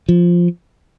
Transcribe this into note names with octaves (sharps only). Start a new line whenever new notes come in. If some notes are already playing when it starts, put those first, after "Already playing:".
F3